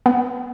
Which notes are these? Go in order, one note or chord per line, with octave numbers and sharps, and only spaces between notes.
B3